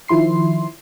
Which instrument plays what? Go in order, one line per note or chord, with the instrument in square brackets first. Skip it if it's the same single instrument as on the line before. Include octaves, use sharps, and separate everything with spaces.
[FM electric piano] D#3 F3 E4 C6 C7